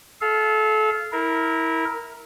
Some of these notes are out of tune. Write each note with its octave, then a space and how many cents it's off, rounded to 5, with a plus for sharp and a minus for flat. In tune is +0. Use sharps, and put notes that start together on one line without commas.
A4 -30 F5 -15
E4 -20 A#4 +0